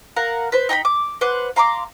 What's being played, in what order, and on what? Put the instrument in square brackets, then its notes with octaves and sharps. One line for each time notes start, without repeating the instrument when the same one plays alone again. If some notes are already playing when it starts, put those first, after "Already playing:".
[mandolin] A#4 F5 F#5
B4 C5
D#4 G5 A#5 B5
D6
B4 C5 F#5 D6
F5 A#5 C6 D6